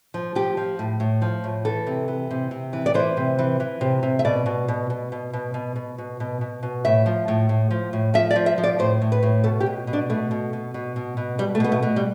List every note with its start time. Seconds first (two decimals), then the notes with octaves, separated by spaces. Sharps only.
0.14 F3
0.35 F3 G4
0.57 F3
0.79 A2
1.00 A2
1.22 F3
1.44 A2
1.65 E3 A4
1.87 C3
2.08 E3
2.31 C3
2.51 C3
2.73 E3
2.86 D5
2.94 E3 C5
3.17 C3
3.39 E3
3.60 E3
3.81 C3
4.03 C3
4.19 E5
4.25 B2 D5
4.46 B2
4.68 B2
4.90 B2
5.12 B2
5.33 B2
5.54 B2
5.76 B2
5.98 B2
6.20 B2
6.41 B2
6.63 B2
6.85 A2 E5
7.06 F3
7.28 A2
7.49 A2
7.71 F3
7.93 A2
8.14 F3 E5
8.31 D5
8.36 F3
8.46 E5
8.58 F3
8.64 D5
8.79 A2 C5
9.02 A2
9.12 B4
9.23 A2
9.44 B2 A4
9.60 G4
9.66 B2
9.87 B2
9.93 D4
10.10 B2 A3
10.31 B2
10.53 B2
10.74 B2
10.96 B2
11.17 B2
11.38 B2 G3
11.55 A3
11.60 B2 B3
11.72 A3
11.82 B2
11.96 G3